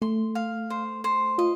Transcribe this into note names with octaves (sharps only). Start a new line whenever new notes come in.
A3 C6
F5
C5
C5
F4 D#5